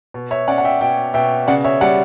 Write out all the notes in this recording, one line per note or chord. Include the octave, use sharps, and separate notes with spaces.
B2
C#5 E5
C#4 D5 F#5
F#5
E5 G5
B2 E5 G5
B2 E5 G5
C#3 D5 F#5
C#5 E5
G3 D5 F#5